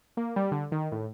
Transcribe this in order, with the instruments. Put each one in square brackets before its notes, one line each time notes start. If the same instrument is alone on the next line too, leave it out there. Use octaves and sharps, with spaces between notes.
[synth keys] A#3
G3
D3
D#3
A2